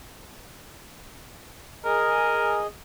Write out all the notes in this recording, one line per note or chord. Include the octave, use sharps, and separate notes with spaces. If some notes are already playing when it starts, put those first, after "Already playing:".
G#4 A#4 D#5